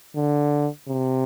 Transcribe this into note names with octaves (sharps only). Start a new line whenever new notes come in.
D3
C3